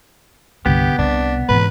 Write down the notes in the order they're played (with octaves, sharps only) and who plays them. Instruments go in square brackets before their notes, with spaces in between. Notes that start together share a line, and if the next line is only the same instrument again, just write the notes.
[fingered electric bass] C2 G2 [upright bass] D3 [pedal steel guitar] B3 [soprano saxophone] G4
[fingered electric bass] C2 [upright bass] C3 [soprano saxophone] D4
[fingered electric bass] G#2 E3 [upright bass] B2 [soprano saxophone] B4